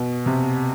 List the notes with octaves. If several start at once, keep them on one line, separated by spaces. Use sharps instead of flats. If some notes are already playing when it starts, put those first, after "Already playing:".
Already playing: B2
C3